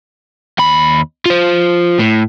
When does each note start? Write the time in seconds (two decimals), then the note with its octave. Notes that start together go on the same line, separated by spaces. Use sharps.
0.59 D#2 B5
1.26 F4 C5
1.99 A2